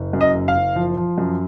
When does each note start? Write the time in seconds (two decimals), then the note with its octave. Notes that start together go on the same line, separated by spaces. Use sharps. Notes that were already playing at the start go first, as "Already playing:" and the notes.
Already playing: F#1
0.13 F#2
0.21 D#5
0.34 F#1
0.48 F5
0.55 F#1
0.76 F3
0.97 F3
1.18 F#2